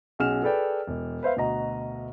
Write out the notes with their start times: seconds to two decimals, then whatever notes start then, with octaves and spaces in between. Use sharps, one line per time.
0.19 B1 C#4 F#4 G#4 F6 E7
0.43 G#4 A4 B4 D5 G5
0.87 E1
1.23 B4 C5 E5 F5
1.36 D2 B2 F#4 D#5 A#5